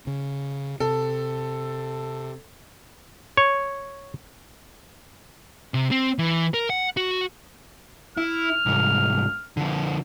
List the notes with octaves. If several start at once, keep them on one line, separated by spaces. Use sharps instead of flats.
C#3
C3 A4
C#5
C3
C4
E3
A#4
F#5
F#4
E4 F6
C2 G#2
D3 F3